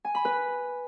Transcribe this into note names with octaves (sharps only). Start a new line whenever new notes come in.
G#5
B5
B4